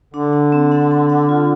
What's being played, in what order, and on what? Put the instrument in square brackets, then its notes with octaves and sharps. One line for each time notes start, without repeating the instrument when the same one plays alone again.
[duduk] D3 [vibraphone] D4
[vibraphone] D4
C4
D4
C4
D4
F4